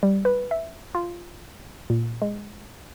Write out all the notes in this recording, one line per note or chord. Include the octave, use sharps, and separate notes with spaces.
G3
B4
E5
F4
A#2
G#3